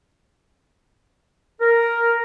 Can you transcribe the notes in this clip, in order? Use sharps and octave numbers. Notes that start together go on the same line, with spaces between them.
A#4